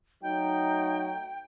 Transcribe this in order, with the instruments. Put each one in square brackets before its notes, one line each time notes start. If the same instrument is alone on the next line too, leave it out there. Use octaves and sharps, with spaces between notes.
[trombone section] F#3 A3 D#4 [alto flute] G5